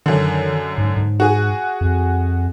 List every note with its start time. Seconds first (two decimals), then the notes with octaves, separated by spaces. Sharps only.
0.06 F#2 D3 D#3
0.78 G#2
0.96 G#2
1.20 F#4 G#4
1.81 F2